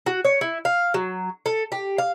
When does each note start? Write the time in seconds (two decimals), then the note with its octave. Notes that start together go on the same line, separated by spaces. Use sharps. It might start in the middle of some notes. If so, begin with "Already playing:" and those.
0.06 F#4
0.25 C#5
0.41 E4
0.65 F5
0.94 F#3
1.46 A4
1.72 G4
1.98 F5